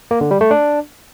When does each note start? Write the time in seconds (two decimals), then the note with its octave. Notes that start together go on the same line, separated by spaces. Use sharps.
0.11 A#3
0.21 D3
0.31 G3
0.41 A3
0.51 D4